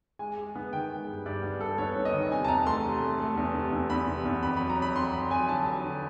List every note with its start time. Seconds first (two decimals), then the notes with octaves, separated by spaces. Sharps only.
0.19 G#3 G#5
0.38 G#3
0.55 B3
0.73 D#3 G5
0.91 G#3
1.08 G2
1.25 G2 D5
1.43 B3
1.61 G2 A4
1.78 B3 C#5
1.96 B3
2.05 D#5
2.14 D#3
2.31 C3 G#5
2.45 A5
2.48 E2 A#5
2.66 A3 C6
2.85 C3
3.02 A3
3.20 A3
3.37 E2
3.55 C3
3.72 E2
3.90 E2 B5
4.08 C3
4.25 E2
4.43 F2 B5
4.57 F#3 B5
4.70 A#5
4.78 F2 B5
4.96 F2 C6
5.13 F2 B5
5.31 F#3 G#5
5.48 D3 A5
5.66 F#3
5.84 D3